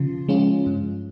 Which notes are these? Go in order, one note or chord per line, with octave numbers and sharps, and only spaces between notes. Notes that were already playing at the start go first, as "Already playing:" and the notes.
Already playing: C#3 F3 F4
F3 G#3 C#4 F4
G2